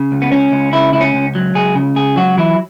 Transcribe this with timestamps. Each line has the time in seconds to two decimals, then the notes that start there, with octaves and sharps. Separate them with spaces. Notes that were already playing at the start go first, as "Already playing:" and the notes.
Already playing: C#3
0.12 C#2
0.22 B3
0.32 C#2 C#4
0.52 C#2
0.73 C#3 E4
0.93 C#2 E4
1.01 C#4
1.14 C#2
1.35 F#3
1.55 C#2 G#4
1.75 C#3
1.96 C#2 G#4
2.16 F#3 F#4
2.38 E3 E4